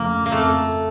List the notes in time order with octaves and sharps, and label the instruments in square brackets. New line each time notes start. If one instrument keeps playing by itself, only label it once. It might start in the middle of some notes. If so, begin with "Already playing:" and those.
Already playing: [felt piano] F2 C#3 F3 A3 [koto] A#3
[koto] A#3
[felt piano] F2 [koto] A3